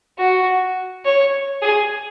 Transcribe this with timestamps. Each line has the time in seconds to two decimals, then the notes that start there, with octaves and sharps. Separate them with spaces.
0.18 F#4
1.05 C#5
1.62 G#4